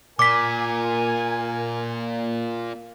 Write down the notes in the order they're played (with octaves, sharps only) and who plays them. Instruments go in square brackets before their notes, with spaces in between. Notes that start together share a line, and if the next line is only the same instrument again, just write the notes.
[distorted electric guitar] A#2 [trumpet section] A#4 G#5 [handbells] D6 B6